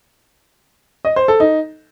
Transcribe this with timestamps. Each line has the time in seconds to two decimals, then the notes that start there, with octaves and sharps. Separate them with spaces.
1.05 D#5
1.16 C5
1.28 A4
1.40 D#4